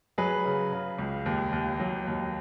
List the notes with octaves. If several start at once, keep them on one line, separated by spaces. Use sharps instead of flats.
F#3 G#4 B4
C#3
C#3
C#2
D#2
D#2
F#3
D#2